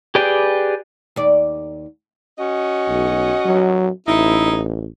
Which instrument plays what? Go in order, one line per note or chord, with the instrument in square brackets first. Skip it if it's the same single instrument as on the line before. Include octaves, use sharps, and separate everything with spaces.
[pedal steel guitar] G4 G#4 B4 D5 G5
[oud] D#2 D5
[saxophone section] C#4 F#4 D#5
[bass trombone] B1
F#3
[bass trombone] A1 [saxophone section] D#4 E4